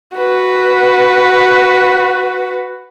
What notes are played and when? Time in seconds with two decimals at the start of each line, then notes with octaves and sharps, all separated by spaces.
0.15 F#4 B4